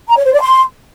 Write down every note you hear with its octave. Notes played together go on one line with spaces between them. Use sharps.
A#5
C#5
C5
D5
C6